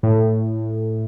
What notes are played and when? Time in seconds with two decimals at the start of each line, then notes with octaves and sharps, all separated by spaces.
0.03 A2